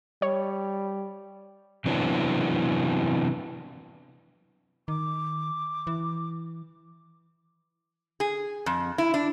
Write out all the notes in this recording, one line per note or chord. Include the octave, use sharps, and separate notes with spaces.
G3 C#5
C3 E3 F#3 B3 C4 D4
D#3 D6
E3
G#4
F2
E4
D4